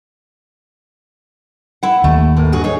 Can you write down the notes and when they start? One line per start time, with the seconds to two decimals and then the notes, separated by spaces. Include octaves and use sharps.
1.83 E4 F#5
2.04 D#2 A3
2.37 A2 E3 A#4
2.52 G2 F#4 G#4
2.64 D#4 G#4 C#5